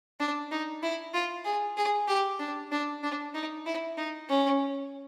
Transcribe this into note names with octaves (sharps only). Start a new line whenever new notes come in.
D4
D#4
E4
F4
G#4
G#4
G4
D4
D4
D4
D#4
E4
D#4
C#4